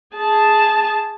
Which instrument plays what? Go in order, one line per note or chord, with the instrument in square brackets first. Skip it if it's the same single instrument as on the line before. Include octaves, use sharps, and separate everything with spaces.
[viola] G#4 A5